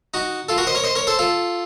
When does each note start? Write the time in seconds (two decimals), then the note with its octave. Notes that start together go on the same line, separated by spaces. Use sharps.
0.14 D#4 F#4
0.49 F4 A4
0.58 F#4 A#4
0.67 C5 D#5
0.75 A#4 C#5
0.84 C5 D#5
0.96 A#4 C#5
1.07 A4 C5
1.19 F4 A4